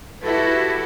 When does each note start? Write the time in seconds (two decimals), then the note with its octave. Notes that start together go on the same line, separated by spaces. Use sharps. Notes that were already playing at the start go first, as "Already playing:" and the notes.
0.22 E4 F#4 G4 A4 B4